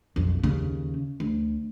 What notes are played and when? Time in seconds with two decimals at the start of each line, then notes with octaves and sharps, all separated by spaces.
0.16 B1 F2
0.44 D#2 C#3
1.20 D2